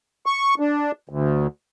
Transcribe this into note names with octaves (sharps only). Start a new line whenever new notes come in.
C#6
D4
D2